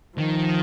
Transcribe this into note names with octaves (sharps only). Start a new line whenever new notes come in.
D#3 F3